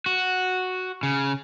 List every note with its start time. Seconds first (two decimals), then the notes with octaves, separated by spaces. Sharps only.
0.06 F#4
1.03 C#3